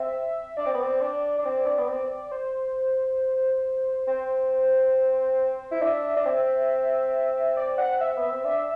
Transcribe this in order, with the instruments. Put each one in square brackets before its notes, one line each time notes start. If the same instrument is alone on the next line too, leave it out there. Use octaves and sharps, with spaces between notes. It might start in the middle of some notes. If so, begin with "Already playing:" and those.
Already playing: [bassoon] C4 [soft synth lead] E5
[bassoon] D4 [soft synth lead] D5
[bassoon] C4
B3
C4
D4
D4
C4
D4
B3
C4
[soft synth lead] C5
[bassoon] C4 [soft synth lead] C5
[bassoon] E4
[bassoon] D4 [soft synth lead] E5
[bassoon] D4
C4
[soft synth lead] D5
F#5
E5
[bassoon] B3 [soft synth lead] E5
[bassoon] C4
[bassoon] D4 [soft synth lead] E5